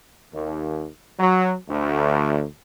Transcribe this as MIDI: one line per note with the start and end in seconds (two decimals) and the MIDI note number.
0.33 0.86 39
1.19 1.54 54
1.68 2.44 38